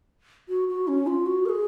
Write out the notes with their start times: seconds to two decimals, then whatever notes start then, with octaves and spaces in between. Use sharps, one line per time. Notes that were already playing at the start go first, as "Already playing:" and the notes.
0.49 F#4
0.68 F#4
0.88 C#4
1.07 F4
1.26 F#4
1.46 A#4
1.49 G#4